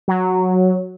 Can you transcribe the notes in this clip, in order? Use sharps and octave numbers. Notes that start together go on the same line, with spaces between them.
F#3